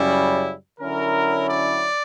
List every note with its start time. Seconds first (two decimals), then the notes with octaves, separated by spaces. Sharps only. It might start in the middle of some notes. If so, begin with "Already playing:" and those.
Already playing: F#2 C#3 G3 C#4 E4
0.80 D3 F#3 C#4 E4 A#4
1.48 D5